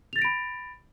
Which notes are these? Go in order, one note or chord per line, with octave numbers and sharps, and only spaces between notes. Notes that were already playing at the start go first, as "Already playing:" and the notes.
B5 A6 A#6 D7 F7